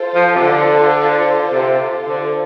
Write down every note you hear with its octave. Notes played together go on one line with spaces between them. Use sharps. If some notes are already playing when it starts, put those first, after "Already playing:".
Already playing: F4 A4 C5
F3
C3
D3
C3
D3